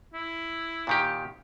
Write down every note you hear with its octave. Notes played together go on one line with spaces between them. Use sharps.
E4
A#2 D#3 G4